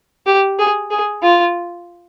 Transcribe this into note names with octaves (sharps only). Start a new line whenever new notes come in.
G4
G#4
G#4
F4